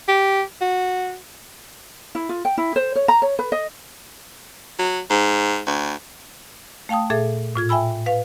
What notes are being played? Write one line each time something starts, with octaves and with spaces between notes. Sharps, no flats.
G4
F#4
E4
F4
G5
E4
C5
C#5
A#5
C#5
B4
D#5
F#3
G#2
D2
A3 F5 G5 A5 D#6
A#2 G#4 A4 E5 D6
A2 F4 G#6
E5 G5 G#5 B5 E6
B4 F5